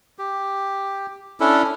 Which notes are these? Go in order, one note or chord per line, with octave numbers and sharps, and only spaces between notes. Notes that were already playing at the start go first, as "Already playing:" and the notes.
G4
C#4 D4 E4 A4